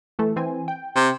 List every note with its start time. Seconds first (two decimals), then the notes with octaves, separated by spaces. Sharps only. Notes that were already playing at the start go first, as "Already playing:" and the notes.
0.19 E3 A3 A4
0.36 E3 C4 G#5
0.68 G5
0.96 C3